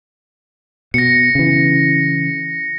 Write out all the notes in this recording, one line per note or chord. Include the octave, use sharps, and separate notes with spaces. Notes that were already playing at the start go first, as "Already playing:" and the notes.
B2 A#6 C#7
C#3 E3